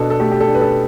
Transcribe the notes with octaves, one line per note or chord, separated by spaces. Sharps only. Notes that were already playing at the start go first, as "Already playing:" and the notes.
Already playing: B2 D4 A4 B4
A4
A3 G4
G4
A4
D4
B4
A4